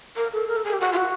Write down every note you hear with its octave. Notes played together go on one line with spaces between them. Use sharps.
A#4
A4
A#4
A4
G#4
G4
F#4
F4
F#4